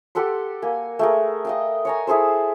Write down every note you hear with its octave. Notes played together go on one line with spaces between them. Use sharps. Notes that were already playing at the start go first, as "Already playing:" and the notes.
G4 A4 F#5 C6
A#3 G#5
A3 G#4 A#4
D#5 F5 G5
C#5 G#5 A#5
E4 G#4 A4 C5